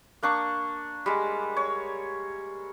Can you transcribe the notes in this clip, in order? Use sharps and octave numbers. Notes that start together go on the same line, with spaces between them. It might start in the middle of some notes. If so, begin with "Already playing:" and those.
A#3 D4 C#6
G3 G#3
C#5